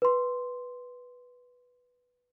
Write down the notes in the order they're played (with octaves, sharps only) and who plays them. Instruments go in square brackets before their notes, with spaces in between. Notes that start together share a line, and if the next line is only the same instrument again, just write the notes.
[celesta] B4 C6